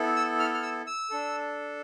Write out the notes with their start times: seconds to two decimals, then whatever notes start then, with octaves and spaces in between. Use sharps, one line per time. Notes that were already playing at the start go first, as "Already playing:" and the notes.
Already playing: B3 E4 A4
0.16 E6
0.39 F6
0.54 F6
0.63 E6
0.87 E6
1.10 D4 A4